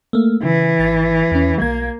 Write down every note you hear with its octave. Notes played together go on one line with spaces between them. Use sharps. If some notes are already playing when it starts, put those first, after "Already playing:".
A3 A#3
C#3 E3
G#1 A6
E2 C#4
B1 A#3 G#6